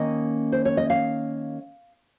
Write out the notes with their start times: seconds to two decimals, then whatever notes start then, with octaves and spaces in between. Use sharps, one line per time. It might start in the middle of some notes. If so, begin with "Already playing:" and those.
Already playing: D#3 A#3 C#4 D#5
0.52 C5
0.65 C#5
0.77 D#5
0.90 F5